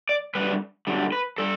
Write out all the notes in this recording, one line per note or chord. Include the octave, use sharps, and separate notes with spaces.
D5
F#2 D3 G3 B4
F#2 D3 G3
B4
G3 A4